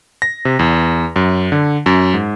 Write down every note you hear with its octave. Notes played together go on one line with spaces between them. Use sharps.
A#6
C3
E2
F#2
D3
F#2
G#2